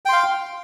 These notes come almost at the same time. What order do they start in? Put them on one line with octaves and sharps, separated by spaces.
G5 C6 F5